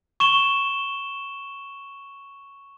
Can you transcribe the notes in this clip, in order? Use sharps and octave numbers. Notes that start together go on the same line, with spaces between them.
C#6 E7 G7